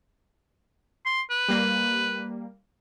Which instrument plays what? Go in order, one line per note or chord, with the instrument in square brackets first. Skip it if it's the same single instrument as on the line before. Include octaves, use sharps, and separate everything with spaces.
[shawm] C6
B4
[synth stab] G3 A#3